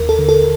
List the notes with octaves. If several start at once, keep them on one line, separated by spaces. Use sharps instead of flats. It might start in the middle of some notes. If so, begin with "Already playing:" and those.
Already playing: D#2 A#4
A4
D3
A4